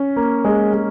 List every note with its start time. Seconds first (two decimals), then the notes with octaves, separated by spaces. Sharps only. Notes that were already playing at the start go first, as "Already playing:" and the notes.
Already playing: C#4
0.16 A#3
0.44 G#3
0.73 G#3